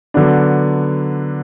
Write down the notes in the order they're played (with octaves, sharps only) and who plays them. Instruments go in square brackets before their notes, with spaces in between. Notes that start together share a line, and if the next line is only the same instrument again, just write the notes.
[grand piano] D3 F#3 B3 D4